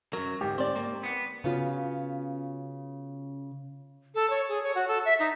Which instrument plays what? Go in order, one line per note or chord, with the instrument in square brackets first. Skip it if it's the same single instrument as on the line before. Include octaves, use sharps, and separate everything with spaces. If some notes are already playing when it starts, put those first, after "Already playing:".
[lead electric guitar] F#2 F#3 [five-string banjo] A#4
[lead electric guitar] D2 G#2 [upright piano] G4
[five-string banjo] C4 D5
[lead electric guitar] A#3
B3 F#5
[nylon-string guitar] C#3 B3 C#4 F4 F#4
[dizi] A4
C#5
G#4
C#5
F#4
A4
E5
D#4